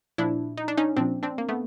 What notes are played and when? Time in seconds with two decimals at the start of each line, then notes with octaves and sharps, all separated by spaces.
0.18 A#2 F3 D4 E4
0.58 D#4
0.68 D4
0.78 C#4 D#4
0.97 A#2 F3 C4 D4
1.23 C4 D4
1.38 A#3
1.49 A3 B3